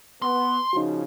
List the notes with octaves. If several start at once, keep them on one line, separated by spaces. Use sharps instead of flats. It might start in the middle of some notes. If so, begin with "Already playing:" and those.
B3 C6
C#3 F3 D#4 F#4